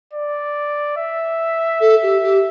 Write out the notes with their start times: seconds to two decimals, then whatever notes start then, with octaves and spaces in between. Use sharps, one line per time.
0.14 D5
0.97 E5
1.80 A4
2.02 G4
2.23 G4